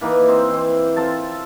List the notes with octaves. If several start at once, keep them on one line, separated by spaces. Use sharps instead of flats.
E3 A#3 D#4 B4
C4 D#4 C5
E3 C4
C4 F4 A4 A5